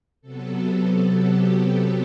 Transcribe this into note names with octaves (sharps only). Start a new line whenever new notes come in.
C3 F#3 B3 A4
G4
A4